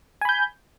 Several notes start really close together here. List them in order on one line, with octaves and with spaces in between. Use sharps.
G#5 B5 G6